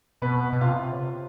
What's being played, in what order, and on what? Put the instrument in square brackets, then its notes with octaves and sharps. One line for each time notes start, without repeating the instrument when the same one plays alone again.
[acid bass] B2 [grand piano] B3 B4
[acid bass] B2
[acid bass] C3 [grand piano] F4 F5
[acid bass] C#3
C3